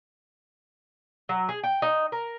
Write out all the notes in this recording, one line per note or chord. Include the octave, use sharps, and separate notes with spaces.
F#3
G#4
G5
D#4
A#4